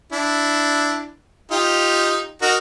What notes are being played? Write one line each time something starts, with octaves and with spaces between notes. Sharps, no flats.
D4 E4
D#4 F4 G4
D#4 F#4 A#4